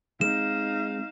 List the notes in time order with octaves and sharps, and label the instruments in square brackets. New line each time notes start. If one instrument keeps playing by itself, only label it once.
[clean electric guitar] G#3 C4 [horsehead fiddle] D#4 F5 [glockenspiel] E7